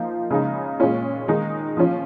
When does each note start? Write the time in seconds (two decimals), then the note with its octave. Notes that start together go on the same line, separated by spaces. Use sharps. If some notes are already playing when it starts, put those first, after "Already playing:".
Already playing: F3 A#3 D#4
0.30 C#3 G#3 D#4
0.80 A#2 G#3 C#4 F4
1.28 D#3 G#3 D#4
1.77 F3 C#4 F4